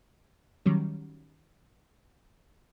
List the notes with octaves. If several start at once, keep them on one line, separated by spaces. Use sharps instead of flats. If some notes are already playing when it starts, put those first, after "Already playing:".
D#3 F#3 G3 C#4